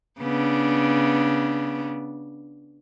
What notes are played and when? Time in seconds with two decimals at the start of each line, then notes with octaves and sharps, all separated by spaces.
0.21 C#3 B3 D4